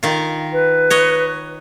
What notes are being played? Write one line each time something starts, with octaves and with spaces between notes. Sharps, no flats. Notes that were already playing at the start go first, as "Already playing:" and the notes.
D#3 F4
B4
C#5 D#5